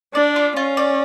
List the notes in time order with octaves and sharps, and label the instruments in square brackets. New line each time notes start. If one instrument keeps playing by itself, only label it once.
[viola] D4 [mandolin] D5
[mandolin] F4
[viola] C#4 [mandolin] F4
[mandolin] D5